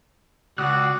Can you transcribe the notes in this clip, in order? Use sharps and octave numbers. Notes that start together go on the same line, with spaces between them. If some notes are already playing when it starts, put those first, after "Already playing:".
C#2 F#4 D5 D#6 E6 F#6